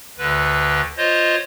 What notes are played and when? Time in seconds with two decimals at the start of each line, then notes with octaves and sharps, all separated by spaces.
0.18 D2 D3 B4
0.97 F4 C5 C#5 D#5